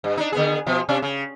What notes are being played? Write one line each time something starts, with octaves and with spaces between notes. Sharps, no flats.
G2
D4 D#4
D3 B3 G#4
B2 F3
C3 C#4 D4
C#3